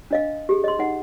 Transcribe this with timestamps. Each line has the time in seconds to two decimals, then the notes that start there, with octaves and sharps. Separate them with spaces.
0.11 D4 D#5 F5
0.49 G4 G#4
0.64 D#5 C6
0.79 D#4 F#5